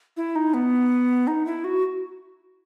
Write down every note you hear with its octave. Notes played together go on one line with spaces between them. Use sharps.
E4
D#4
B3
D#4
E4
F#4